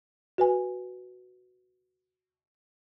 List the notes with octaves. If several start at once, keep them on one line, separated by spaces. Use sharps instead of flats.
F#4 B4 G#5